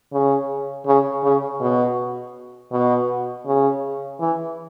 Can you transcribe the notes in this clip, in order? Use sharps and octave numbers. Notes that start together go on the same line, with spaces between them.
C#3
C#3
C#3
B2
B2
C#3
E3